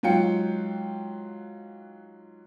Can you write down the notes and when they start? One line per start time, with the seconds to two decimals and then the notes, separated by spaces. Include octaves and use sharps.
0.03 G#2 F#3 F4 G5 C#7